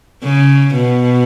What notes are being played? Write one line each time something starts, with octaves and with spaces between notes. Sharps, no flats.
C#3
B2